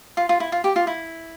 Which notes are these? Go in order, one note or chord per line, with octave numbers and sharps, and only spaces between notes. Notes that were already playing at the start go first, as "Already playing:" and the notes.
F4
F4
E4
F4
G4
F4
E4